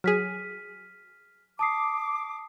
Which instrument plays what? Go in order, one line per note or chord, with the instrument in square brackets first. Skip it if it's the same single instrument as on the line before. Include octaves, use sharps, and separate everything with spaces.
[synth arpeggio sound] F#3 G#4 [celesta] F6 B6 D#7
[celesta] A5 D#6 C7 [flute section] D6